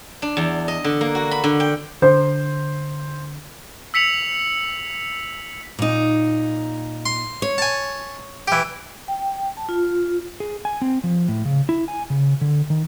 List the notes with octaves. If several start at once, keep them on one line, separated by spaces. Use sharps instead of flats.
D4
E2
D#5
D3
A#3
F#4
B5
D3
G5
D3 C5
E6 B6 C#7 F7 F#7
A#2 D#4
C6
C#5
G#5 A5
E3 G4
G5
A5
F4
G#4
G#5
C4
F3
A2
C#3
E4
G#5
C#3
D3
D#3